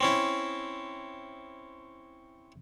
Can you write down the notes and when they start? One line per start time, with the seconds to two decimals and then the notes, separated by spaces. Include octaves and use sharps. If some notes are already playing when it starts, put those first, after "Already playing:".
0.01 C4 C#4 E4